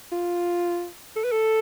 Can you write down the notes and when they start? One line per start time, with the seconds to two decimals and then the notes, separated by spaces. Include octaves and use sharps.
0.12 F4
1.16 A4
1.24 B4
1.32 A4